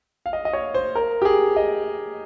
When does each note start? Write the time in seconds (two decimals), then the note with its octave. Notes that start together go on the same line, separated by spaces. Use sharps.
0.26 F5
0.33 D#5
0.45 D#5
0.53 C#5
0.74 C5
0.95 A#4
1.22 G4
1.25 G#4
1.56 D#5